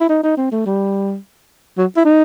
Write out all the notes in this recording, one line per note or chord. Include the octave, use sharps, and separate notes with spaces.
E4
D#4
D#4
C4
A3
G3
F#3
E4
D#4